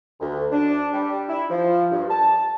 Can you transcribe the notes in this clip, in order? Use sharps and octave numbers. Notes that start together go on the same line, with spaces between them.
D2
D4
G3
E4
F3
G2
A5